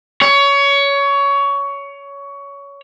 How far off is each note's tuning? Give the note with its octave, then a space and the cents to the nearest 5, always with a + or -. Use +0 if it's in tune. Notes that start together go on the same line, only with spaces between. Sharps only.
C#5 +20